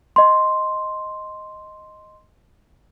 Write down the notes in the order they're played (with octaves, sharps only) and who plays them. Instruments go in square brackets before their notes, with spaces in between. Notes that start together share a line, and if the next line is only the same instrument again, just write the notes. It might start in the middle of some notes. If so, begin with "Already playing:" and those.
[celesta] D#5 C6